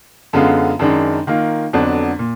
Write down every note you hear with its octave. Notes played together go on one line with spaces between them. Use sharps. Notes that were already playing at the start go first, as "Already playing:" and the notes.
F#2 D3 G#3 B3 F4
F#2 D#3 G#3 D4
D#3 A#3 F4
F2 D3 F#3 B3 D4
A#2